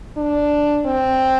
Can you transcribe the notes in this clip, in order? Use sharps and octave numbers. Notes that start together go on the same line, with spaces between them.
D4
C4